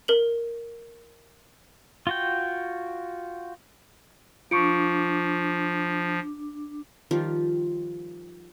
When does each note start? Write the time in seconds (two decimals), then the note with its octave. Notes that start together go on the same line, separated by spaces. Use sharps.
0.08 A#4 F#7
2.07 F4 F#4 G5
4.51 F3 D4 F4 C#6 D6 C#7 D7
7.11 D#3 F3 G3 F4